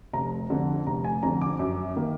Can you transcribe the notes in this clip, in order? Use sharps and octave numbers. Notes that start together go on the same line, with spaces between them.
F1 A#5
F2 D3
F1 A#5
G#5
F2 D3 A#5
D6
F#2
D#3 A#3